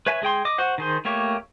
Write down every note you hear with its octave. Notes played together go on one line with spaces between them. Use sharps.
B4 C#5 E5 G#5
G#3 G#4 G5 C6
D#5 D6
F#4 C5 F#5
D#3 G#4 C5
A3 A#3 G4 C#5